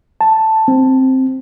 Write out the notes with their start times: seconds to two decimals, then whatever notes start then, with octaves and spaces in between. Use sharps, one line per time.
0.21 A5
0.68 C4